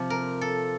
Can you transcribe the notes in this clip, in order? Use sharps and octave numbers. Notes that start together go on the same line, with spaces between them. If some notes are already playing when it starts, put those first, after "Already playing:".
Already playing: C3 F3
A#4
A4